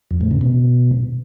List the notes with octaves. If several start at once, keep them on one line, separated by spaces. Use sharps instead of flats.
F2
A2
C#3
B2